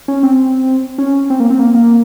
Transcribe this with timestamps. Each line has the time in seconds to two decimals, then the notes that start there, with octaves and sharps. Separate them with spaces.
0.08 C#4
0.23 C4
0.98 C#4
1.30 C4
1.40 A#3
1.50 C4
1.59 A#3
1.74 A#3